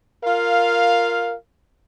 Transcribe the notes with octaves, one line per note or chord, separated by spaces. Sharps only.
F4 A#4 F5